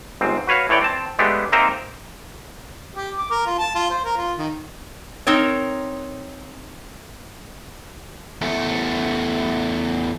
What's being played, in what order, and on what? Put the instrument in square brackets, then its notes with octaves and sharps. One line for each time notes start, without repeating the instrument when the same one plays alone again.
[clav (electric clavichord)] G1 G#2 C4
F#4 B4 C#5 F5
A2 E3 C#5 D5 G5
C4 A5
G#3 A3 B3 D4 G4
A#3 C4 D#4 A#4 C5 E5
[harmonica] G4
D6
A#4
F4
A5
F4
C5
A#4
F4
D#3
[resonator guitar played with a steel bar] C4 D#4 A#4 C#5
[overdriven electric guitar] E2 A3